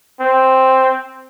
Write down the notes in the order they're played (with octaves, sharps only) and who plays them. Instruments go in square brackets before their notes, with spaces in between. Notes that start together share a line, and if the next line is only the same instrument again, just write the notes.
[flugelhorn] C4